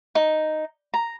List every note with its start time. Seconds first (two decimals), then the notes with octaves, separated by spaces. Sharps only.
0.15 D#4
0.94 A#5